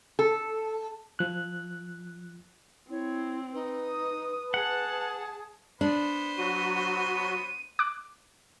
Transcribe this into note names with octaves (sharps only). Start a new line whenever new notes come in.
A4
F3 F#6
C4 E4 C#5
D#4 B4
D#6
G#4 F#5 A5
B3 D4 C5
F#3 F#4 D#7
D6 F#6